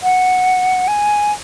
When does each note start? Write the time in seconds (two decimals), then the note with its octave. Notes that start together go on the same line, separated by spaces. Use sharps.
0.03 F#5
0.88 G#5